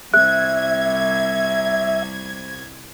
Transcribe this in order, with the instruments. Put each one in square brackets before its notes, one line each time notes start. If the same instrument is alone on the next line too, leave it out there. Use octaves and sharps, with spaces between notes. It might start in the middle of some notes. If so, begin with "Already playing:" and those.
[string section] C2 G#6 [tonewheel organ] E5 [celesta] F#6